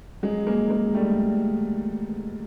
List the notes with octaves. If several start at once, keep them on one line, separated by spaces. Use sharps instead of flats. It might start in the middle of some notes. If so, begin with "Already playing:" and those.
F#3 G#3
G#3 A#3
G#3 A#3
G3 A3